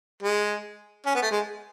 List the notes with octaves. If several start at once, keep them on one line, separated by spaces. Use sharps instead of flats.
G#3
C#4
B3
A3
G#3